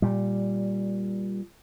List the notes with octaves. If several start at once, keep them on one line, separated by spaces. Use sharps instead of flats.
A#2 G3